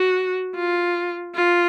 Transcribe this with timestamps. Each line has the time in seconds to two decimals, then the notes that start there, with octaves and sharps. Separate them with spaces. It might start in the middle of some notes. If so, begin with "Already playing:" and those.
Already playing: F#4
0.55 F4
1.35 F4